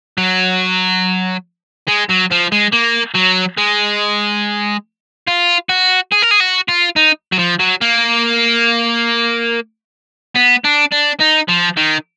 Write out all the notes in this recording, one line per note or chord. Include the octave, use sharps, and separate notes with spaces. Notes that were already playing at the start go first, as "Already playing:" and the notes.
F#3
G#3
F#3
F3
G#3
A#3
F#3
G#3
F4
F#4
G#4
A#4
G#4
F#4
F4
D#4
F#3
F3
F#3
A#3
B3
D4
D4
D#4
F3
D#3